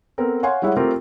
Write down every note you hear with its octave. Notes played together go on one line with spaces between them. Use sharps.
B3 C4 A4 A#4
C#5 F5 F#5 G#5 C6
G3 G#3 E4 C#5 E5 F#5
A3 C4 F4 G4 A#4